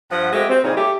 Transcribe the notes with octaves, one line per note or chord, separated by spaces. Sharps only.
G2 F3 F#5
G#3 A3 C4 F#4 G4
C4
A#2 C#3 G3 D#4 G#4
A3 G4